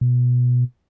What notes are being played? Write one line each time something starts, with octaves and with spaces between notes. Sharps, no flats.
B2